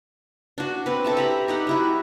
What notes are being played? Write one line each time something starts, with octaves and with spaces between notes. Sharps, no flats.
D4 F#4
C4 B4
A4 E5 A5
G4 A#5 B5
D#4 G4 F#5
G3 E4 F#4